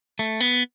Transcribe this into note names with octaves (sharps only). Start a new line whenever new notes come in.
A3
B3